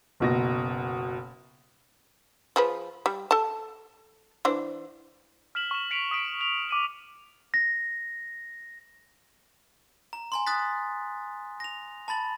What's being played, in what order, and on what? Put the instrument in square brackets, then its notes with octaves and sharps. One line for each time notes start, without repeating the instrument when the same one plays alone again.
[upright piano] F#1 B2 A#6
[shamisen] F3 G#4 B4
G3
A4 A5
E3 D4 C5
[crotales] F6 B6 E7 F#7
C#6 E7
B6 C#7 D7 F7
D#6 B6 D7
F7
D6 D#7 F#7
[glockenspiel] A#6
A#5
G#5 A#5 C6
D#6 F#6 A6 B6
A#6 F7
A5 B5 A6 F#7